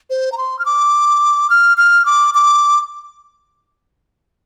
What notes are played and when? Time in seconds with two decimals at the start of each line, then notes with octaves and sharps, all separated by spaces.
0.10 C5
0.32 A#5
0.38 C6
0.59 F6
0.65 D6
1.50 F6
1.77 F6
2.06 D6
2.35 D6